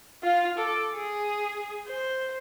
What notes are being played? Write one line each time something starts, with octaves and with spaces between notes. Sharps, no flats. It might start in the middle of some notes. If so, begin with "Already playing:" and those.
F4 F5
A4 D6
G#4
C5